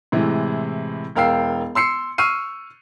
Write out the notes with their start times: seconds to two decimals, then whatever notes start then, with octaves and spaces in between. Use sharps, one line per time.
0.12 A2 C3 E3 G#3
1.15 E1 A#4 F5 G5 E6 C7
1.75 C6 E6 C7 C#7
2.18 C#6 E6 F6 C7 D#7